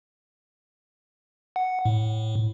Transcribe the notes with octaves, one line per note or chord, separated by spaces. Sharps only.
F#5
A2